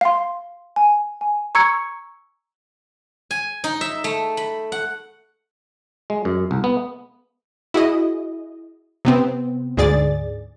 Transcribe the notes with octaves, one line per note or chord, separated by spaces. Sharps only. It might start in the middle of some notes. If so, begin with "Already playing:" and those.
F5 C6
G#5
G#5
A#5 C#6 E6 G#6 C#7
G#5
D#4
E5
A3
B5
F#5
G#3
F#2
C2
B3
E4 F#4 G#4 D#5
C3 B3 C4
D2 G#2 G#4 D5 A6